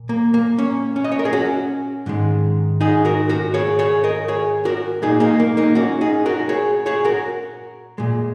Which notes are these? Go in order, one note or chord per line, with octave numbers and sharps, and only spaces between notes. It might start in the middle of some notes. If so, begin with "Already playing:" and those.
Already playing: A#2
A#3
A#3
C#4
C#4
D#5
C#5
A#4
G#4
C#4 F#4
G#2 D#3 G#3
D#4 G#4
F#4 A#4
F#4 A#4
G#4 C#5
G#4 C#5
A#4 D#5
G#4 C#5
F#4 A#4
A#2 G#3 D#4 G#4
A#3 D#4
A#3
A#3 D#4
C#4 F#4
D#4 G#4
F#4 A#4
G#4 C#5
G#4 C#5
F#4 A#4
A#2 G#3